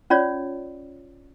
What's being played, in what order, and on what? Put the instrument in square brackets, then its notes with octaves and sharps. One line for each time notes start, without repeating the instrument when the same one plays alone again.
[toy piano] C#4 F4 C#5 D5